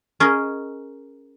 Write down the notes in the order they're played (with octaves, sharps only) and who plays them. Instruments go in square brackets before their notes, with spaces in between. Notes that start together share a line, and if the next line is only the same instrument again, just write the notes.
[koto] C#4 G#4 A#4 D#5